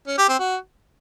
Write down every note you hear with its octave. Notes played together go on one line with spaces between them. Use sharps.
C#4
G4
C4
F#4